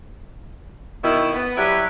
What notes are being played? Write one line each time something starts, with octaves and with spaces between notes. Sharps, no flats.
B2 D#3 E4
B3
F#3 G3 E4 G4 B4